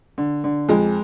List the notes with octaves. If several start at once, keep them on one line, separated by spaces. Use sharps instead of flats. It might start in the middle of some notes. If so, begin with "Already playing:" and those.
D3
D3
F2 G#3